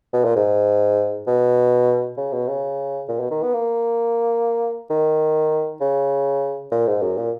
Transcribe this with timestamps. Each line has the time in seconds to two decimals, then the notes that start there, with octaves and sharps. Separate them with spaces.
0.13 B2
0.24 A#2
0.36 G#2
1.27 B2
2.17 C#3
2.33 B2
2.48 C#3
3.08 A#2
3.20 B2
3.31 D#3
3.43 B3
3.54 A#3
4.90 D#3
5.81 C#3
6.72 A#2
6.87 G#2
7.02 F#2
7.17 A#2